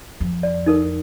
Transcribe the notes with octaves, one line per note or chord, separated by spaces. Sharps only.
F2
D5
D#4 A4 A#4